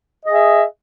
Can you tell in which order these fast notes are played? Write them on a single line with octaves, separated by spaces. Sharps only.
D#5 G#4 E5